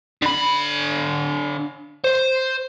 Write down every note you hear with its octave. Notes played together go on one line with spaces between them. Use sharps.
D3 B5
C5